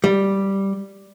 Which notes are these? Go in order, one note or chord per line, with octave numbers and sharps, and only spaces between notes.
G3